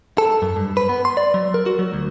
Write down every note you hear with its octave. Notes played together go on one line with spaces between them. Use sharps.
A4
F#2
G2
B4
B3
C6
D5
F#3
A#4
F#4
F#3
D2